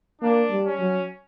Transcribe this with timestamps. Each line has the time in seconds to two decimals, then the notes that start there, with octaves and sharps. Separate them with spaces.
0.21 A#3 D4
0.51 G3
0.66 C#4
0.79 F#3